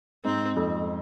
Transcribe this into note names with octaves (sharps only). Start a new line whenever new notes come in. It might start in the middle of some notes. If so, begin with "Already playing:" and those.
G#2 C4
F2